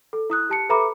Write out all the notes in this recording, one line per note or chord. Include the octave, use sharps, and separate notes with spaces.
A4
E4 D#6 F#6
G4 A5 C#7
A4 B4 E5 A#5 B5 D6